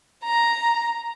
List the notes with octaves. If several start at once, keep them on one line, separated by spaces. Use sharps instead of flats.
A#5